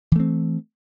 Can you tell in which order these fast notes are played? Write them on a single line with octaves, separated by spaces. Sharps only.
E3 A3 C4